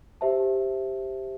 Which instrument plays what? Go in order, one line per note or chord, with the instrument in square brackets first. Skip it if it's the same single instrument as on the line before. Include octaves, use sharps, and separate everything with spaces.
[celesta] G4 C5 E5 A5